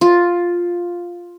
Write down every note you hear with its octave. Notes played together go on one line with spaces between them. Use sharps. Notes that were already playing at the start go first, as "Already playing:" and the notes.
F4